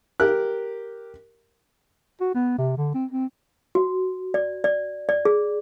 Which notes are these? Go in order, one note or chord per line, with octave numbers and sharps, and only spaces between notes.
G4 A#4 F#6
F#4
B3
C3
D3
C4
C4
F#4
D5
D5
D5
G#4